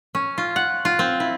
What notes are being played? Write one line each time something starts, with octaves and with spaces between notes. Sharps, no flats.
C#4
F4
F#5
F4
C4
E4